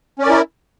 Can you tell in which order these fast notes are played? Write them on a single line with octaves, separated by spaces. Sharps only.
C#4 D5 A#4 E4